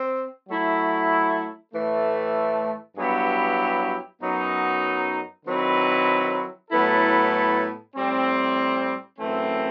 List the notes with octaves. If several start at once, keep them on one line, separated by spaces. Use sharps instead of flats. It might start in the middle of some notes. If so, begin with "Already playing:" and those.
Already playing: C4
F#3 A3 E4
A2 E3 A3
G2 F#3 B3 E4 G4
F#2 F#3 B3 D#4
D#3 F#3 C4 E4 B4
A2 F#3 B3 E4 A4
A2 G3 C4
F#2 E3 A3 C4